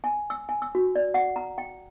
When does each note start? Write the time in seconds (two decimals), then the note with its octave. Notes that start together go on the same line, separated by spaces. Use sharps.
0.04 G#5
0.30 E6
0.49 G#5
0.62 E6
0.75 F#4
0.96 D5
1.14 F#5
1.36 A#5
1.58 G5